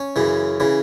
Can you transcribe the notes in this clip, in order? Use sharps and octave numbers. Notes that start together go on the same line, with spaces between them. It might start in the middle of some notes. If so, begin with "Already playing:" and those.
Already playing: C#4
F#2 C#3 E3
C#3 E3